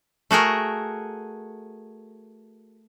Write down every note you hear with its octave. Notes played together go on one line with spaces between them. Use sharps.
A3 F#4 G#4 A#4